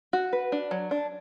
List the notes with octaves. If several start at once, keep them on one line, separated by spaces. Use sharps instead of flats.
F#4
B4
D4
F#3
D4